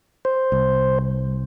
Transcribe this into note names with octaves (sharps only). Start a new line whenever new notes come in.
C5
C2